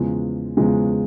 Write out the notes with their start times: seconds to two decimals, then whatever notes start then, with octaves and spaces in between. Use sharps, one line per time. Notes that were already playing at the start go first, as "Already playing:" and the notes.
Already playing: E2 C#3 F3 G#3
0.57 E2 C#3 F3 G#3